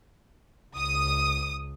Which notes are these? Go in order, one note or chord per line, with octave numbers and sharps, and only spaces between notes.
C#2 D#6